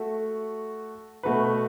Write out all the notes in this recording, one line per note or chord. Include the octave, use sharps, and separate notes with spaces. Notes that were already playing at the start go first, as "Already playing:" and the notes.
Already playing: A3 F#4 A4
B2 A3 F#4 B4